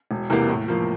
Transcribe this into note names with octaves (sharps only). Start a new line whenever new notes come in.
E1
E2 C3 E3 A#3
A2
F3 A#3